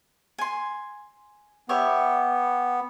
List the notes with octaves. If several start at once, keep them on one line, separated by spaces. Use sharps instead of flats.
G#5 C6
B3 G4 C#5 E5